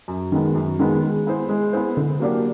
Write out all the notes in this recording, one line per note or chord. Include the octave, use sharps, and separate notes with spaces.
F#2
D#3 G#3 B3
F#2
D#3 G#3 B3
G#3
B3 E4 G#4 C5
G#3
B3 E4 G#4 C5
D3
F#3 A#3 D4 G4